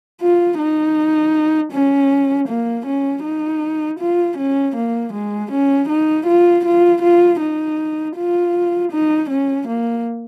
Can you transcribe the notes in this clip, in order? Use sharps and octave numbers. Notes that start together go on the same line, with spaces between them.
F4
D#4
C#4
A#3
C#4
D#4
F4
C#4
A#3
G#3
C#4
D#4
F4
F4
F4
D#4
F4
D#4
C#4
A#3